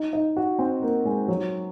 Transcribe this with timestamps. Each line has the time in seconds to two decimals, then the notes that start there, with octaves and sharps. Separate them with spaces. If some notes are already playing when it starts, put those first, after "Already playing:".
Already playing: D#4
0.13 D#4
0.37 F#4
0.59 C4
0.82 A#3
1.05 G#3
1.28 F#3